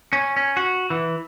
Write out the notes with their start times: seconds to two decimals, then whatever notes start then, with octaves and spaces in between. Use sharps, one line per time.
0.13 C#4
0.37 C#4
0.57 F#4
0.90 E3